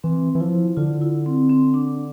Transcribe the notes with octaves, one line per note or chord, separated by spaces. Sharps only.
E3 C4
E3
F3 E4
D3 F4
E4
C4
C4
D4